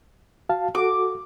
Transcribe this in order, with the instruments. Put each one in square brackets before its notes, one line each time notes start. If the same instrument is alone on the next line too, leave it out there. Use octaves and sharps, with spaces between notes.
[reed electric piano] F#4 F5 A5
[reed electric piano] F#4 A4 [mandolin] D6